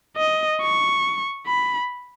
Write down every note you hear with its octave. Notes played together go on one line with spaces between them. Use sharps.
D#5
C#6
B5